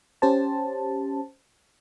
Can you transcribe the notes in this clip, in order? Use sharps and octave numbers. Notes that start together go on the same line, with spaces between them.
C#4 G4 C5 A5